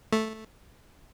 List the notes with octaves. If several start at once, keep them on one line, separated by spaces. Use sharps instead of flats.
A3